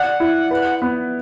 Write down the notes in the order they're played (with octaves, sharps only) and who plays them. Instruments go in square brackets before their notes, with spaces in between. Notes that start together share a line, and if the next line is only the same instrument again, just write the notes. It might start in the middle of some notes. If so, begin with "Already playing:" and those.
Already playing: [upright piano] D5 [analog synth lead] F#5
[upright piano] E4
B4
B3